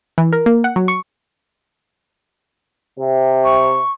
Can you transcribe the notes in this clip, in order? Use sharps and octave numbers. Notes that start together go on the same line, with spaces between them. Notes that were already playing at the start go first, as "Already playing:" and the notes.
E3
A#4
A#3
F#5
F#3
C#6
C3
C#6